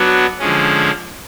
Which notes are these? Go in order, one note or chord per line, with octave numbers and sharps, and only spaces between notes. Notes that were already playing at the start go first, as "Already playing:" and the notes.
Already playing: F#3 B3 D4 F#4
D3 F3 G#3 C#4